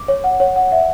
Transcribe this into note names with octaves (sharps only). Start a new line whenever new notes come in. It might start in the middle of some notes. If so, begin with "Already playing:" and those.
Already playing: D6
C#5
F#5
C#5
F#5
E5